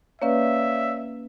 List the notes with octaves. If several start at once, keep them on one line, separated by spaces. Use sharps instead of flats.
A#3 C#4 B4 C#5 D5 E5 F5